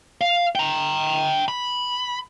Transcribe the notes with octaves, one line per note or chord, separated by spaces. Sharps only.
F5
G5 A#5
B5